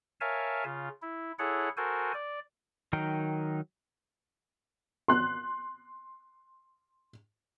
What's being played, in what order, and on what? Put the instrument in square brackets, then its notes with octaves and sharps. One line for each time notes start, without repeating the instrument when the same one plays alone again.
[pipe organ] A#4 C#5 E5 F5 G#5 A5
C#3 F4
E4
E4 G#4 A4 C#5 F#5
F#4 A4 A#4 C5 G#5
D5
[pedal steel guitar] D#3 F#3 D#4 A#4 G5
[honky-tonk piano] C6 F#6